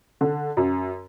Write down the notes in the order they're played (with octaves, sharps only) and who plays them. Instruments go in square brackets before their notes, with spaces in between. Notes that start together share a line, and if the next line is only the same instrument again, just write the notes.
[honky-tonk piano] D3
F#2